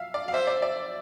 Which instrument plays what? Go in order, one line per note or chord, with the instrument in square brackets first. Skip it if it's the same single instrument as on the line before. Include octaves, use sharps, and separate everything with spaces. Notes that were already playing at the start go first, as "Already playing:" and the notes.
Already playing: [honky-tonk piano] E5 F5
D5
F5
[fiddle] C5 [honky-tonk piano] E5
[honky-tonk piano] D5
D5